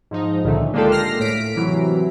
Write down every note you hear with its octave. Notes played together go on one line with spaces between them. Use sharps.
G#2 F3 D#4
C#2 A#2 D3 D#3 A3
G#3 A#3 D4 F4 G4 A4
F6 A#6 C7
A2 B6 D7
C3 E3 F#3